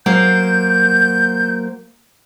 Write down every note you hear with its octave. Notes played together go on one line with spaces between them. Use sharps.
F#3 A#3 C5 G6